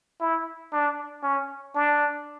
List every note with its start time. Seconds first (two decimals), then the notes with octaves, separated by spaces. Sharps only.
0.21 E4
0.72 D4
1.23 C#4
1.75 D4